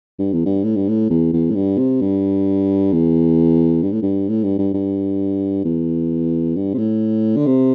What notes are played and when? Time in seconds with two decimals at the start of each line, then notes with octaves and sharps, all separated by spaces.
0.19 G2
0.32 E2
0.45 G2
0.64 A2
0.76 G2
0.88 A2
1.10 E2
1.33 E2
1.50 A2
1.55 G2
1.78 C3
2.01 G2
2.92 E2
3.83 G2
3.92 A2
4.02 G2
4.29 A2
4.43 G2
4.58 G2
4.74 G2
5.64 E2
6.56 G2
6.74 C3
6.78 A2
7.36 D3
7.46 C3